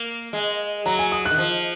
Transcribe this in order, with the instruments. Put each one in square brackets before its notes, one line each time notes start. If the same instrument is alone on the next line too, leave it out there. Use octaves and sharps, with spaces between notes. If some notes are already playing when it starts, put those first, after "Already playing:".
Already playing: [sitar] A#3
G#3
[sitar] F#3 [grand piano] A#5
[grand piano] G#5
D#6
F#6
[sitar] D#3
F3